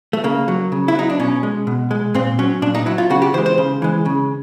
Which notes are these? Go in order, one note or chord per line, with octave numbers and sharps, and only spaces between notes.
A3
C#3 A#3
F#3
C#3
E4
F#3 D#4
D4
B2 C#4
G#3
B2
G#3
A#2 C4
F#3 C#4
A#2 D4
D#4
F#3 E4
F4
C#3 F#4
G4
E3 G#3 C5
C5
C#3
E3 G#3
C#3